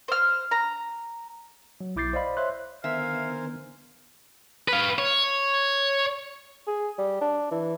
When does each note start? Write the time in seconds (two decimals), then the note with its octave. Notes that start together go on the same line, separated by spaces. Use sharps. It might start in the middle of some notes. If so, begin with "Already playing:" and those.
0.08 C5 F6
0.51 A#5
1.81 F#3
1.96 B1 E4 D6 G6 A6 C7
2.13 C5 D5 D#5 F5 B5
2.37 C5 C#5 E5 C6 F#6
2.84 D3 D#3 B3 A#4 C5 E5 F5 G#5
4.68 B4 F5
4.99 C#5
6.67 G#4
6.98 G3
7.21 D4
7.51 E3